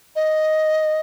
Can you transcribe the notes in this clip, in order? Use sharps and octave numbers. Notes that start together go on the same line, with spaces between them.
D#5